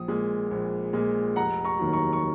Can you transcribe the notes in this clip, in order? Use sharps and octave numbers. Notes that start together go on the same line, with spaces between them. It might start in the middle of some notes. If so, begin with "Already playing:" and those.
Already playing: A#1 D#6
A#2 G#3
A#1
A#2 G#3
F1 F#5 A#5
A#5 C#6
D#2 D#3 F#3
A#5 C#6
C#6